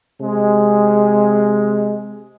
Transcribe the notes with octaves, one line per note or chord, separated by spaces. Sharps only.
C3 G#3